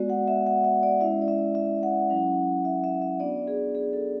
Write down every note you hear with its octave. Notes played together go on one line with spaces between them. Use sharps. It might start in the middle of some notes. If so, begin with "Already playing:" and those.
Already playing: G#3 B3 F#4 D5
F#5
E5
F#5
E5
D5
G#3 C#4 E4 E5
D5
E5
E5
F#5
F#3 C#4 E4
E5
E5
E5
B3 D4 F#4 D5
G#4
G#4
A4